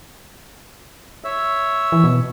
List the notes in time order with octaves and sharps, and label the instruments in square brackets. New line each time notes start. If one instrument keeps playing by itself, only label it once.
[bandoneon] C#5 E5 E6
[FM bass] E3
B2